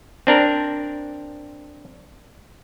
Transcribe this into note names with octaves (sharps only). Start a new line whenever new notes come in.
C4 D4 A#4